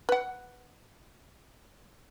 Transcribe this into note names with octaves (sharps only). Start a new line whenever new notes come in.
B4 F#5